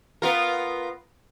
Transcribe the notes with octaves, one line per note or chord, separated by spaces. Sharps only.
B3 F4 A#4